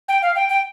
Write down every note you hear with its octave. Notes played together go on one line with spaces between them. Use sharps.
G5
F5
G5
G5